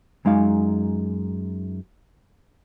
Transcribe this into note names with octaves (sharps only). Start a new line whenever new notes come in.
F#2 G#3 D#4 F5